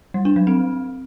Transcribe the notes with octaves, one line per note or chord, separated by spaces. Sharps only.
G3
D4
F#3
C4